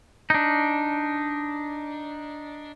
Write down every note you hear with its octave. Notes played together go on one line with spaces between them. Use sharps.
D4 D#4